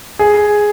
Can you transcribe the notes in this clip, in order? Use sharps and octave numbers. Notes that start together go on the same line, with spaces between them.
G#4